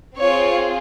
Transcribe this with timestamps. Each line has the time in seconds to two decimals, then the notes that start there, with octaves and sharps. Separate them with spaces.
0.18 C4 F4 G#4 C#5